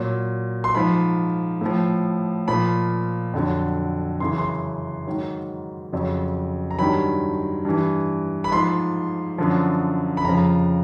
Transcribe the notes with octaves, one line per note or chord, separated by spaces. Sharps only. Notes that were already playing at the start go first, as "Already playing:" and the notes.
Already playing: A#2 F#3
C6
G#2 F3 B5
A2 F3
A#2 F3 B5
F2 D3 F#3
F#2 C#3 E3 C6
C6
G#2 D#3 F#3
F2 C#3 F#3
A#5
G2 D#3 F#3 B5
G2 E3
B5
G#2 F3 C6
F#2 D3 F3
B5
F2 C#3 F3 A#5